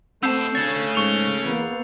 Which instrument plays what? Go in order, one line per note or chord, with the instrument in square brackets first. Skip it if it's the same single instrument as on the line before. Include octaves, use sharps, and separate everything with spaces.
[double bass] A3 [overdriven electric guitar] B3 A5 [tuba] C4 [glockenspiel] E6 G6 C7
[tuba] D2 [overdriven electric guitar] G#4 C#5 [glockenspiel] A6
[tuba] G#2 [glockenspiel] C#6 C#7 F7
[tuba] E2 [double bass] A#3 B3